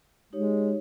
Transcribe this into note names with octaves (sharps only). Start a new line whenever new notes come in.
G#3 D#4 G4 C#5